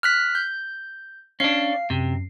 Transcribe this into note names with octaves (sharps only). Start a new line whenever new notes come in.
F6 F#6 B6
G6
C#4 D4 F5 C7
F#2 C3